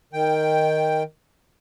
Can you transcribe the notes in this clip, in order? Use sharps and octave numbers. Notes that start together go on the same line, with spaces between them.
D#3 G5